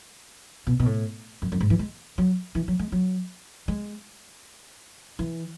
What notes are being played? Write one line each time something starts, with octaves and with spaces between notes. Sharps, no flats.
B2
B2
A2
F#2
F#2
G#2
E3
G#3
F#3
E3
F#3
G#3
F#3
G#3
E3